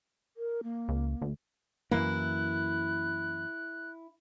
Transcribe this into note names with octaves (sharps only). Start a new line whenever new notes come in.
A#4
A#3
C#2
D2
F#2 E3 A#3 E4 F#6